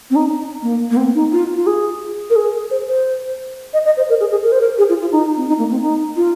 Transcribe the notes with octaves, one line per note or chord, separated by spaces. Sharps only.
C4
D#4
A#3
A#3
C4
D#4
F4
F4
G#4
A#4
G#4
C5
C5
D#5
D#5
C5
A#4
G#4
G#4
A#4
C5
A#4
G#4
F4
F4
D#4
C4
D#4
A#3
C4
D#4
F4